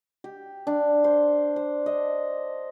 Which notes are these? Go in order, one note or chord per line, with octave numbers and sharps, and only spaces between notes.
G4
D4
C5
C5
D#5